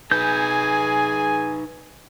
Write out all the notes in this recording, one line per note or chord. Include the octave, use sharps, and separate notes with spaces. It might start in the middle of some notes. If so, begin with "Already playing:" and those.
D#4 G#4 B4 G#5 G6